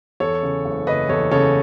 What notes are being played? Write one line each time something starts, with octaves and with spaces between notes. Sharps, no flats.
E2 A4 C#5
C#3
F#1
F#1 B4 D#5
E2 A4 C#5
C#3 A4 C#5